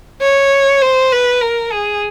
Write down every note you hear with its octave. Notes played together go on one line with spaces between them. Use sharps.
C#5
C5
B4
A#4
G#4